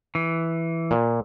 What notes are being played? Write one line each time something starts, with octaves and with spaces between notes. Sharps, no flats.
E3
A#2